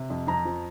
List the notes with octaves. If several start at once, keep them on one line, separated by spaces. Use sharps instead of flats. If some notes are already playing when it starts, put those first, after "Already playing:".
Already playing: C3
F2
F2 A#5
F3